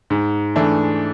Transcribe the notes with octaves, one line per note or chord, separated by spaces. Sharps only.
G#2
E3 A3 D4